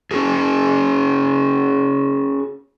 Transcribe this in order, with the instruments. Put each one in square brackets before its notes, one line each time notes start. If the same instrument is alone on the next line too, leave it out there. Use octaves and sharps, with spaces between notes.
[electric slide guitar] C#4 F#4 G#4